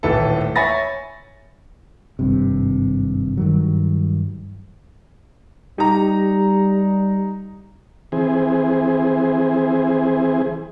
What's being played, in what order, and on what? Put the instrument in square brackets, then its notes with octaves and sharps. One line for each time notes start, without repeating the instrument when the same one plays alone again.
[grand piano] D#1 A2 E3 E4 A4
C#5 E5 G#5 B5 A6 A#6
[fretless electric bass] G#1 G2 C3
G2 D#3 F#3
[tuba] G3 [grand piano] D#4 A#5 [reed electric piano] G4
[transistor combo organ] E3 C4 G#4